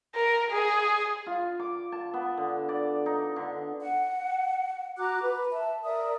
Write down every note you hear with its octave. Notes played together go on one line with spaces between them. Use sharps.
A#4
G#4
F4
D6
A5
B3
D3
D5
D#4
D3
F#5
F#4 A#5 D6 F#6
B4
E5 A5
A#4 D5 E5 D#6